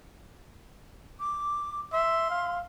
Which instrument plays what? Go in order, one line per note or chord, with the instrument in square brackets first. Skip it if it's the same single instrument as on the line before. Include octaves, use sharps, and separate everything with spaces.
[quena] D6
[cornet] E5 [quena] C6
[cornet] F5